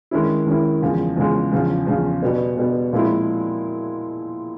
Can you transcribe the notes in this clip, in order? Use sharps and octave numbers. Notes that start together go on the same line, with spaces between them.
D#3 G#3 C#4 E4
D#3 G#3 C#4 E4
E2 C#3 F3 G#3
E2 C#3 F3 G#3
E2 C#3 F3
E2 C#3 F3
B2 G3 B3
B2 G3 B3
A#2 F3 G#3 C4 E4